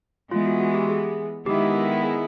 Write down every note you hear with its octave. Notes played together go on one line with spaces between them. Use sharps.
E3 G#3 B3 F4
F#4
F#4
G4
G#4
D#3 G#3 B3 E4 G4
G#4